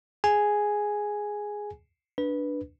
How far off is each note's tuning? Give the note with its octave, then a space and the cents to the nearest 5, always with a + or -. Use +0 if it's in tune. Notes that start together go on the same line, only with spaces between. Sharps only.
G#4 +0 G#5 +0
D4 +0 B4 -5